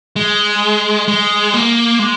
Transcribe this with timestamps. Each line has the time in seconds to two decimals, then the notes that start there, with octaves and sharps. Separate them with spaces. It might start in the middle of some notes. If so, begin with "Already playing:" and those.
0.16 G#3
1.08 G#3
1.53 A#3
1.99 G#3